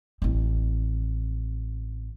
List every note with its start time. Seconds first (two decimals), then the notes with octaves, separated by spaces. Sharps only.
0.22 A1 C4